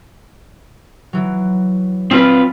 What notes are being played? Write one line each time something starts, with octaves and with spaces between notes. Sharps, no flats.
E3 F#3
C4 F4 B4